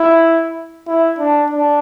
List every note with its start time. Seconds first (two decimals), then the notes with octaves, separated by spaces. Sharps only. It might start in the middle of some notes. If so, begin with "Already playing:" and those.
Already playing: E4
0.87 E4
1.19 D4
1.50 D4